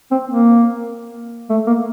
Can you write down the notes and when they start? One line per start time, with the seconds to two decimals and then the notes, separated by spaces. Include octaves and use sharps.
0.11 C4
0.28 A#3
1.50 A3
1.67 A#3